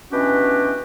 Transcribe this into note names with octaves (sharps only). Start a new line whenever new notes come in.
B2 E3 C#4 D4 F#4 G4